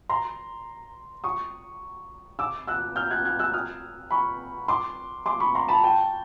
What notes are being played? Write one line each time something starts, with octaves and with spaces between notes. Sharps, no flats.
A#5 C6
C#6 D#6
D6 E6
E6 F#6
F6 G6
F#6 G#6
F#6 G#6
E6 F#6
D#6 F6
B5 C#6
C6 D6
C6 D6
B5 C#6
A#5 C6
A5 B5
G5 A5